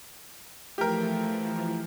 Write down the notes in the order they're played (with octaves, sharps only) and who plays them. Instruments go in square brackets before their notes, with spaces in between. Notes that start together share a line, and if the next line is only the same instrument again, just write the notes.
[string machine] E3 F3 [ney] A3 [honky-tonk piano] G4 A#4